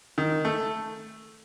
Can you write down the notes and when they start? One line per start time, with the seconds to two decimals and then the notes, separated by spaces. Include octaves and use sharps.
0.18 D#3
0.45 A3